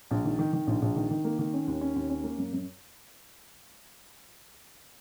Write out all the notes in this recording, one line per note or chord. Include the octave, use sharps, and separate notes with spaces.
A#1
D#3
D#3
D#3
A#1
A#1
D#3
D#3
A#3
D#3
C#4
D#2
C#4
D#2
C#4
A#3
F#2
F#2